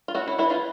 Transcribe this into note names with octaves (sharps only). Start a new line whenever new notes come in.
F4
C#4 E4 F#4
E4
E3 E4
D#4 F4